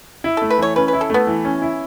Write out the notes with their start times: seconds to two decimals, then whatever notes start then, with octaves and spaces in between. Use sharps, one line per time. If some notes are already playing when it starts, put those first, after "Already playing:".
0.24 E4
0.37 A3 A4
0.50 B4
0.58 E3 C#5
0.76 C#4 B4
0.88 B4
0.93 E4
1.01 A4
1.10 A3 B3
1.27 E3
1.45 C#4
1.62 E4